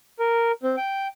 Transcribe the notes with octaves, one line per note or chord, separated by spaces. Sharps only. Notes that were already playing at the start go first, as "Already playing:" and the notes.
A#4
C4
G5